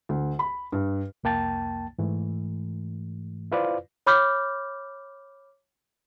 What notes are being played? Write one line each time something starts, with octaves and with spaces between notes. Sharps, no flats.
D2
B5
G2
C2 F2 A#3 G5 A5 A6
G#2 E3 A3
E4 F4 B4 C5 D5 F5
C#5 B5 D6 F6 G6